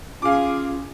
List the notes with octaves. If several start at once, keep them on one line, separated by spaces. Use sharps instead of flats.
C#4 F4 G#4 F5 D6